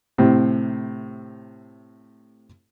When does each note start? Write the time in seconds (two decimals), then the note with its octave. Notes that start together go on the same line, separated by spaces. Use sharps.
0.18 A2 C3 C4